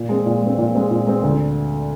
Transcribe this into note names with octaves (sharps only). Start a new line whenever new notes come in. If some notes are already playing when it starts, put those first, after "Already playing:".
Already playing: A#2
G#3 C4
A#2
G#3 C4
A#2
G#3 C4
A#2
G#3 C4
D2